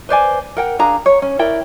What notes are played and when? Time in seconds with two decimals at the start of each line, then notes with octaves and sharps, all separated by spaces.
0.09 B4 C5 D5 G#5
0.57 A#4 F#5 G5
0.79 D4 G#4 F5 A#5
1.06 C#5
1.22 C#4
1.39 E4 A#4 D5 G5